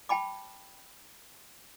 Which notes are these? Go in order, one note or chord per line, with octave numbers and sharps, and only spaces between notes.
G5 A5 B5 D6